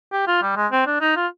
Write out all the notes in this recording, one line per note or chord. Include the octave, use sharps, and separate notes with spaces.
G4
F4
G3
G#3
C4
D4
D#4
F4